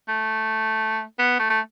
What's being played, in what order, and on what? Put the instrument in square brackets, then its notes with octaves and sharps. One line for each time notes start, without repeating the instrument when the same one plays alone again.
[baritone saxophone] A3
B3
A3
A3